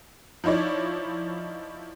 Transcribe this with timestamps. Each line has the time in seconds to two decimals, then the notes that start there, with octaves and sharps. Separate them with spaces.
0.44 F3 D#4 E4 C#5 D5